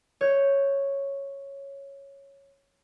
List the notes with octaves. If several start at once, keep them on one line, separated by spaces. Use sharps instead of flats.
C#5 G6